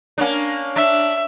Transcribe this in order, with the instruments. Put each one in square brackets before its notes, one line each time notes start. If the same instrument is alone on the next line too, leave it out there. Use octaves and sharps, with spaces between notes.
[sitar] A#3 C#4 D4
[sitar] D4 [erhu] E5